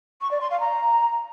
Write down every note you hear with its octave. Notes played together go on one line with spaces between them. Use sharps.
C#6
D5
C6
F5
A#5